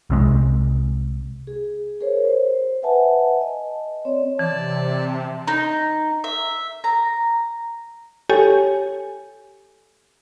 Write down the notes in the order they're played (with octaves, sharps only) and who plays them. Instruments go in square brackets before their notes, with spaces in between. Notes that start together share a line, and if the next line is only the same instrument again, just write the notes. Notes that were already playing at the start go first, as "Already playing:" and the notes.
[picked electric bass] C2 C3 G#3
[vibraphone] G#4
G#4 A#4 C5 C#5
C5
B4 E5 F#5 G#5 A5
D#5
C4 C#5 D5
[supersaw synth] C3 [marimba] E3 [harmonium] D5 A5
[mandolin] D#4
E5
A#5
[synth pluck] G4 A4 C#5 G#5